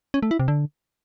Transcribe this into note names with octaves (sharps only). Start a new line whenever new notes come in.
C#4
A3
E4
C3
D3